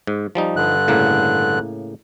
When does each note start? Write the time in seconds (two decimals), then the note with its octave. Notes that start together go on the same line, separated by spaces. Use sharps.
0.07 G#2
0.35 F3 G3 D#4
0.56 G2 D3 F#6
0.88 A2 C#3 A#3